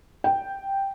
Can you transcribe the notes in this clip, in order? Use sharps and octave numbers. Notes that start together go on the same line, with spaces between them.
G5